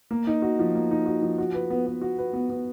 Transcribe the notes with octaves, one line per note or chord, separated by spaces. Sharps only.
A#3
D#4
F#4
F3
A#3
D#4
F#4
F3
F#4
B4
B3
B3
F#4
B4
B3
B3